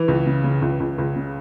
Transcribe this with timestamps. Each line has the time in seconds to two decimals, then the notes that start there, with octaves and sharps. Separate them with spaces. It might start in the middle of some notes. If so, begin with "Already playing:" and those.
Already playing: E3
0.08 C#2
0.27 C#3
0.44 C#3
0.62 C#2
0.80 C#2
0.98 C#2
1.16 C#3